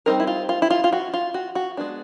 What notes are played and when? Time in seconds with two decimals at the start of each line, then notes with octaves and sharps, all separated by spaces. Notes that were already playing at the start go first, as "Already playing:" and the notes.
0.06 G3 C4 D#4 A#4
0.20 E4
0.27 F4
0.49 F4
0.62 E4
0.70 F4
0.84 F4
0.93 F#4
1.14 F4
1.34 F#4
1.55 F#4
1.77 G#3 B3 D4